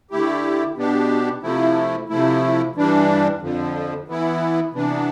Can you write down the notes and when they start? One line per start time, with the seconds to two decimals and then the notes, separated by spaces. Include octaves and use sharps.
0.11 D3 A3 E4 G4
0.77 B2 B3 D4 G4
1.43 C3 F3 A3 E4
2.09 C3 F3 A3 E4
2.76 G2 E3 G3 D4
3.41 F2 D3 F3
4.08 E3 B3 E4
4.74 C3 E3 B3 D4